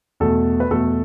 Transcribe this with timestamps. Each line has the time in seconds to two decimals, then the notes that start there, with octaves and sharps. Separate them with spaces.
0.20 E2 B2 A3 A4
0.60 B4
0.70 E2 B2 A3 A4